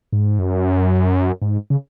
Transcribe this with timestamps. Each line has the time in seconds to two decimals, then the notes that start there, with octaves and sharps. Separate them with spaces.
0.13 G#2
0.39 F#2
1.42 G#2
1.70 C#3